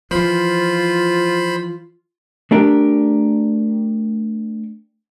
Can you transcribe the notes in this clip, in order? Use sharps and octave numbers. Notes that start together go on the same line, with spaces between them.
E3 F3 F4 C5 B5
A3 D4 G4 A#4